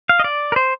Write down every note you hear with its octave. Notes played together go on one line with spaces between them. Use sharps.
F5
D#5
D5
A#4
C5